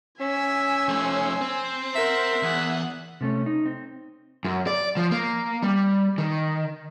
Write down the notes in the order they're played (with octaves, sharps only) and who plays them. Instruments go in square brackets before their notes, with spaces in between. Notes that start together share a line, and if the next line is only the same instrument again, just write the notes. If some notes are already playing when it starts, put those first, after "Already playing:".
[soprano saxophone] C#4 [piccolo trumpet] E5 [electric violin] G#5 E6
[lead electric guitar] F2 A3 [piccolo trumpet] C5
[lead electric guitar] C4
[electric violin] A#4 F#5 [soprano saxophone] E5
[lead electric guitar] E2 [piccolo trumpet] G#4 [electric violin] F#5
[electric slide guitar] C3 A3 C#4
D#4
C4
[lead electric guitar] F#2
D5
F3
A#3
G3
D#3